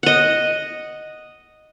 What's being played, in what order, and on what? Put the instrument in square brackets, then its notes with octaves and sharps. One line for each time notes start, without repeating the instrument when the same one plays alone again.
[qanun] D#5 F#5